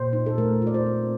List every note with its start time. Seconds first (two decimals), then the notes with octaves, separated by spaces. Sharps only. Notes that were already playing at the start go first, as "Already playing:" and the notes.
Already playing: A#2 C5
0.13 D#4
0.26 A4
0.38 A3 A#4
0.62 F4 D5
0.74 C5
0.86 C4